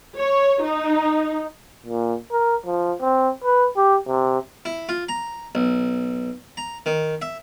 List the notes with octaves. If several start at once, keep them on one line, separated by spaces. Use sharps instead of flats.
C#5
D#4
A#2
A#4
F3
C4
B4
G4
C3
E4
F4
A#5
B1
A#5
D#3
E5